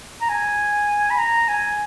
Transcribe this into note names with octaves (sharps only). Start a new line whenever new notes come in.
A#5
G#5
B5
A#5
G#5